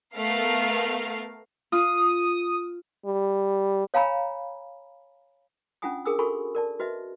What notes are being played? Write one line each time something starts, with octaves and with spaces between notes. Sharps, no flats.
A3 B3 A#4 F5
F4 D#6
G3
C#5 F5 G#5 A#5 B5
C#4 D4 F4 F#5 G#5 D#6
D4 G#4 A#4 G#5 D#6 E6
F#4 A4 A#4 G#5 B5 C#6
A#4 D5 A5
F#4 B4 D#5 E5